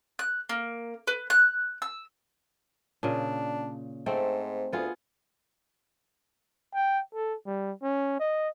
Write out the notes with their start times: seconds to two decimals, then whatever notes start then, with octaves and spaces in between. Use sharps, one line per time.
0.19 F#6
0.49 A#3
1.07 B4
1.30 F#6
1.82 E6
3.03 A#2 C#3 D4
4.06 G#2 A3 C4
4.73 D2 B3 F4 G#4
6.74 G5
7.14 A4
7.46 G3
7.83 C#4
8.19 D#5